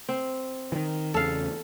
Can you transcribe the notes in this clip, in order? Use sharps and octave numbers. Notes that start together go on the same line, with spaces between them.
C4
D#3 E3
E2 C#3 A4 F5